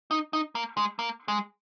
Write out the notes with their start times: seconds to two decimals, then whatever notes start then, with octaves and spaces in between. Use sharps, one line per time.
0.11 D#4
0.33 D#4
0.55 A#3
0.77 G#3
0.99 A#3
1.28 G#3